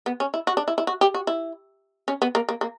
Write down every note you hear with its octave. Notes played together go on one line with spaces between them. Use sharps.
B3
C#4
E4
F#4
D4
E4
E4
F#4
G4
F#4
E4
C#4
B3
A#3
A#3
A#3